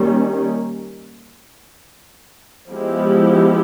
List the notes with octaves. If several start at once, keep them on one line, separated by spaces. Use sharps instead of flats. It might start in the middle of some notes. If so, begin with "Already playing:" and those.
Already playing: D#3 G3 A#3 C#4
F3 G#3 B3 E4 G4